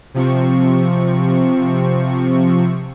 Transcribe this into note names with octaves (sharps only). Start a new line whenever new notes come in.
C3 F3 C4 C#6